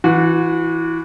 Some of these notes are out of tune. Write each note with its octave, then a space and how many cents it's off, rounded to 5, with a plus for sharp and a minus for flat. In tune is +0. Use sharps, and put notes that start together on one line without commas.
E3 +0 F#4 -30